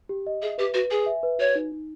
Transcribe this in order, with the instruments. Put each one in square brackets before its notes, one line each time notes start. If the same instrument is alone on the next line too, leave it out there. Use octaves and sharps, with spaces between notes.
[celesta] G4
D#5
[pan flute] G#4 [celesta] E5
[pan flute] G4 [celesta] B4
[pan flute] F#4 [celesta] B4
[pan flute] G#4 [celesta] G#5
[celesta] E5
B4
[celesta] F#4 [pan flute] C#5
[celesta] D#4
D#4